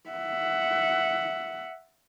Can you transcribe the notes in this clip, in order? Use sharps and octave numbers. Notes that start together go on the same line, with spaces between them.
E5 F#5